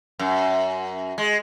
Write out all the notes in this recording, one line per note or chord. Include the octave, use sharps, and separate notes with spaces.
F#2
G#3